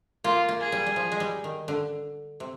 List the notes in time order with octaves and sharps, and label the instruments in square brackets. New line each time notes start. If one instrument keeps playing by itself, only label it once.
[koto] A#3 [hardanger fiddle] F4
[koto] A#3
[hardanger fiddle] G#4
[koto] G3
G3
F3
G#3
G3
D#3
D3
C3